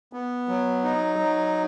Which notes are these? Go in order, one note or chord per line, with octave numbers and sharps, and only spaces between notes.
B3
F#3
D#4
F#3